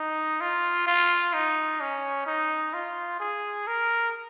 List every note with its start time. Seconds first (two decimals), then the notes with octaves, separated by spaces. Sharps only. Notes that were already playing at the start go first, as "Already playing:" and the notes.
Already playing: D#4
0.41 F4
0.87 F4
1.33 D#4
1.81 C#4
2.26 D#4
2.74 F4
3.20 G#4
3.67 A#4